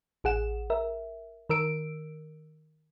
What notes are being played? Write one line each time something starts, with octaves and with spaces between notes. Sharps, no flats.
A1 G#4 F#5 E7
A#4 E5
D#3 A#4 E6 D7